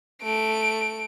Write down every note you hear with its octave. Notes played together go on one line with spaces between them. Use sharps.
A3 D7